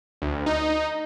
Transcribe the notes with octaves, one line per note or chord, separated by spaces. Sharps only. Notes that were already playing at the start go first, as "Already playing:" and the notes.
D2
D#4